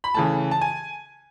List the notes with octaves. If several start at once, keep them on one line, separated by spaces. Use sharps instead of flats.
B5
C#3 E3 A3 A5
A5
G#5